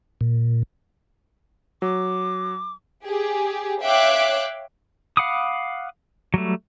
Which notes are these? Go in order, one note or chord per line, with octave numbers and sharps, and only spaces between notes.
A#2
F#3 D6
G4 G#4
C#5 E5 F5 G5 D6 F#6
F5 F#5 B5 D6 D#6
F#3 G3 A3